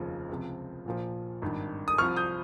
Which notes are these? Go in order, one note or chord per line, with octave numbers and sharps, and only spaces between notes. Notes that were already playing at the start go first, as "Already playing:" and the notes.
Already playing: F1 D#2 C#3 F3
C#2 C3 F3
A#1 A#2 F3
G#1 G2 D#3
D#6
C2 C3 F3 C#6 F6
D#6 G6